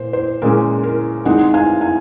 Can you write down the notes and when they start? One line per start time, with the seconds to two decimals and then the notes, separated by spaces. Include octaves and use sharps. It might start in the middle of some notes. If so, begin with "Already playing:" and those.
Already playing: A#2 C5
0.13 C5
0.42 A#2 G#3 C#4 A#4
0.84 A#4
1.25 D#3 G#3 C4 D#4 D#5 F#5
1.54 F5 G#5
1.81 F5 G#5